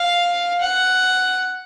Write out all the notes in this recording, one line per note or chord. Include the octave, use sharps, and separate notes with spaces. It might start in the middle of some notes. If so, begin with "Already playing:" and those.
Already playing: F5
F#5